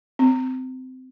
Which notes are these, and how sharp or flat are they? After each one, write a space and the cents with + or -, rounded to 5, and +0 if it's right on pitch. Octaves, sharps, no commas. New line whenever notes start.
C4 -20